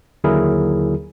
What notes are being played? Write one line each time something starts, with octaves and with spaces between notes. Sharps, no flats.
D#2 D3 F#3 E4 G#4 A#4